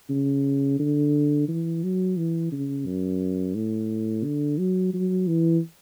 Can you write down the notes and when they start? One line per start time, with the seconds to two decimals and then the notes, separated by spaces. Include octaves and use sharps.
0.10 C#3
0.80 D3
1.48 E3
1.83 F#3
2.17 E3
2.52 C#3
2.86 F#2
3.55 A2
4.24 D3
4.58 F#3
4.94 F#3
5.27 E3